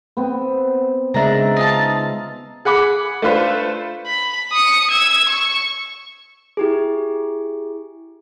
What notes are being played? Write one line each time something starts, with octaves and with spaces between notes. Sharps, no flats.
B3 C4
C#3 G#3 D4 E5 A#5
D#4 F4 A5
G#4 F#5 B5 D6
A3 D4 F4 B4 C5
B5
D#6 C#7
E6 G#6
C#6
E4 G4 G#4